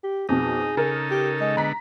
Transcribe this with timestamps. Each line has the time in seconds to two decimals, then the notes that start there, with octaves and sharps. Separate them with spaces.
0.03 G4
0.29 F2 B2 D#4 G#4
0.77 C#3 D#4 A4 A#4
1.11 G4
1.41 G#3
1.57 D3 B3 A#5 B6